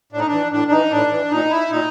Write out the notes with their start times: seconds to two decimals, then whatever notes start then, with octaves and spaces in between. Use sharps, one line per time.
0.13 A2 D4
0.20 D#4
0.27 D4
0.32 E3
0.52 A2 D4
0.68 D4
0.71 E3 D#4
0.91 A2 D4
1.11 E3
1.31 A#2 D#4
1.50 E4
1.70 A#2 D#4